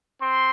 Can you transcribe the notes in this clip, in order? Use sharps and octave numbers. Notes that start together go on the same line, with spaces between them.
C4 C6